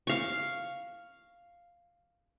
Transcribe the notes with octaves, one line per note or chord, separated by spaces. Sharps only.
F5 C#6